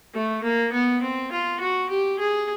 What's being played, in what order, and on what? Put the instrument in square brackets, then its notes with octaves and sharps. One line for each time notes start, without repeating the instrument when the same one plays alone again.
[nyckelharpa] A3
A#3
B3
C4
F4
F#4
G4
G#4